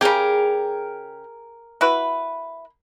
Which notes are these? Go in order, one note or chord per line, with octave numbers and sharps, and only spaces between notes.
C#3 G4 G#4 A#4 A#5
E4 F#4 B4